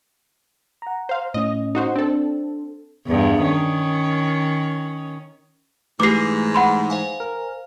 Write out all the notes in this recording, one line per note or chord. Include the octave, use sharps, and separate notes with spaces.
F#5 A#5
C5 F5
A2 C#4 D#5
D#4 F#4 C5
C4 D4 A4
E2 G2
D#3 C#4
G#2 E3 A3 G4 B4 D6 A#6 C7
F#5 B5 C6
C5 F5 G#5
A#4